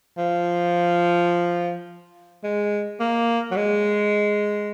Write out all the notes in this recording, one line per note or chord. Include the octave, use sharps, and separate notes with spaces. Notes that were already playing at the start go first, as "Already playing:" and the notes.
F3
G#3
A#3
F#3
G#3